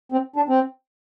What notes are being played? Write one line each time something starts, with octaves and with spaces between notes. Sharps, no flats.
C4
D4
C4